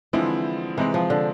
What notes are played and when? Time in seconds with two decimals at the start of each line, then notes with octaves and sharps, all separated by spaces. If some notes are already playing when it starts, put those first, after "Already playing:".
0.13 D3 E3 F3 G#3 C4 E4
0.77 C3 E3 G#3 C4
0.94 F3
1.10 D3